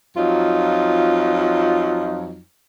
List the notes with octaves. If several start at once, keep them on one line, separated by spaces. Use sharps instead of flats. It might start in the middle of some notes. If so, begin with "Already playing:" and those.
F2 F#3 D#4 F4